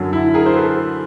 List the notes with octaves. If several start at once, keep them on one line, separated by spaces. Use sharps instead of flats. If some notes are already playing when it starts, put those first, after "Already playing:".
Already playing: F#2 D3 F#3
E4
G#4 A#4
C5
A4 B4